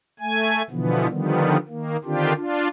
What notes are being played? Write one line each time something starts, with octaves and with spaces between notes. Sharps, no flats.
A3 G#5
B2 D3 E3 F3 B3
D3 D#3 F3 G3 B3
D#3 A#3
D3 D#3 C4 D4 F4 G4
D4 F4